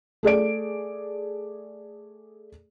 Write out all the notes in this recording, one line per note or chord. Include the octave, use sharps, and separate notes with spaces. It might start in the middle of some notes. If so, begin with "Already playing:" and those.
A3 G#4 D5 D7